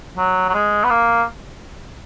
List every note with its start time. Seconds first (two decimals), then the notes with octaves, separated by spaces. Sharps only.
0.17 F#3
0.49 F#3
0.54 G#3
0.84 B3
0.90 A#3